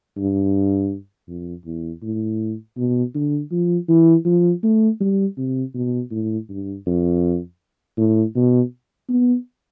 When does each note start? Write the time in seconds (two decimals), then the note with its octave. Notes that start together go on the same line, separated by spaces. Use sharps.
0.17 G2
1.28 F2
1.65 E2
2.02 A2
2.77 B2
3.15 D3
3.52 F3
3.89 E3
4.26 F3
4.63 A3
5.01 G3
5.38 C3
5.75 B2
6.12 A2
6.50 G2
6.86 F2
7.97 A2
8.35 B2
9.09 B3